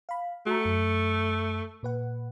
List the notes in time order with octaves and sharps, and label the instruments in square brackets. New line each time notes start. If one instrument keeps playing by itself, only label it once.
[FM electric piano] F5 B5
[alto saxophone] A3 [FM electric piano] F#4 A#5
[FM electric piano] F#2 C#7
A#2 B4 F#5